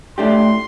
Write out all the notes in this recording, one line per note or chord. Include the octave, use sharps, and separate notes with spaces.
A2 A3 D4 G4 C6